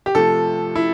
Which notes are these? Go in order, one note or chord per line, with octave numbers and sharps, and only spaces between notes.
G4
C3 F3 A3 A4
E4